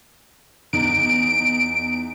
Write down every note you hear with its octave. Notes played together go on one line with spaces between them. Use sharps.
E2 D#4 D7